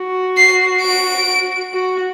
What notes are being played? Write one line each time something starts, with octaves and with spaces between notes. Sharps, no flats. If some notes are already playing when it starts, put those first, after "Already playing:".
Already playing: F#4
C7
D7
F#4